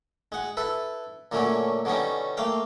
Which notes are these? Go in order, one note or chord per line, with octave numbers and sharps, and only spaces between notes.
G#3 F#5
E4 A4 B4
A#2 D3 F#3 A3 C#4
B2 D3 G3 C#4 D#4
A3 A#3 F5 G5